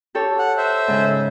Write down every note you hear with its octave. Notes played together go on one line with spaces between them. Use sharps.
G4 A4 C#5
F#5
C5 E5
G#2 C#3 G#4